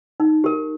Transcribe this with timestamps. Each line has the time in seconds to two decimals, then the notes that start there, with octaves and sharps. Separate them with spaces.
0.20 D#4
0.44 G4 A#4